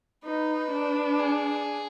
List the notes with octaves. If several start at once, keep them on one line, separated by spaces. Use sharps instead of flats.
D#4 B4
D4
G#4